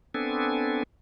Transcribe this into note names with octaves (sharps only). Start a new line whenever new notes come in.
B3 C4 D4 A4 G#5